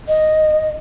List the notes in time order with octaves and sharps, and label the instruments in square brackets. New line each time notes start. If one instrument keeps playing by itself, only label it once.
[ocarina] D#5